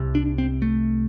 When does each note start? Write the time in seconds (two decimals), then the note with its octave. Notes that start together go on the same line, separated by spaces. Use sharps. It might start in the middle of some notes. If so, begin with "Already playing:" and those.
Already playing: C2 C3
0.15 D4
0.38 C4
0.62 A3